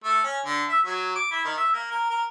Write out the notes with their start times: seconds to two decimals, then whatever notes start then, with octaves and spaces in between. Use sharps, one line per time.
0.04 A3
0.24 C#4
0.45 D3
0.68 E5
0.86 F#3
1.16 D6
1.31 E4
1.45 D#3
1.57 E5
1.73 A#3
1.91 A#4
2.10 A#4